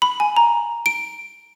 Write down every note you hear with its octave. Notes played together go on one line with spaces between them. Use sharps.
B5
G#5
A#5
D7